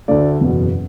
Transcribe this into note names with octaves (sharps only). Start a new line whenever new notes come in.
D2 D3 A3 D5
F#1 E2 B2 B3